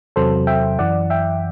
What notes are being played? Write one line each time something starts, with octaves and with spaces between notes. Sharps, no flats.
E2 C3 F#3 A4 C5
E5 G5
F#2 E3 D5 F#5
E5 G5